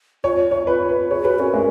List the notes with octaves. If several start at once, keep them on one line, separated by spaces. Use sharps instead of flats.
F4 C#5
C#5
F4 B4
B4
G#4 C#5
F#4 B4
C#4 A#4
G#3